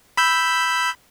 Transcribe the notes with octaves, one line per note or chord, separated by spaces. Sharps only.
B5 E6 G6